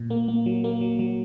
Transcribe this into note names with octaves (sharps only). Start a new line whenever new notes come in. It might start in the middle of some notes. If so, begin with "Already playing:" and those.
Already playing: A#2
A#3
A#3
F#3
A#3
F#3
F#3